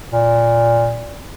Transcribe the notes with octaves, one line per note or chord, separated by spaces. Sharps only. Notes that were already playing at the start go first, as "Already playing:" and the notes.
A#2